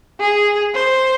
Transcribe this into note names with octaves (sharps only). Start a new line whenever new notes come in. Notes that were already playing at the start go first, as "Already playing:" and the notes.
G#4
C5